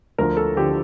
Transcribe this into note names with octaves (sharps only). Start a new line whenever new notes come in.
D2 D3 F3 A#4
A4
D3 F3 G4